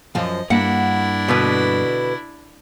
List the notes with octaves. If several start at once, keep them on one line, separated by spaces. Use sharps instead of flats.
F#2 F3 D#5 F5
G2 A#3 D4 E4 F#5
B2 D3 B4